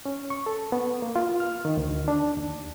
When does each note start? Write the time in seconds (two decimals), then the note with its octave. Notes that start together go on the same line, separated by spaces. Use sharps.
0.05 C#4
0.30 C#6
0.46 A4
0.72 B3
1.02 A#3
1.16 F4
1.40 F6
1.65 D#3
1.77 D2
2.08 D4
2.37 D#2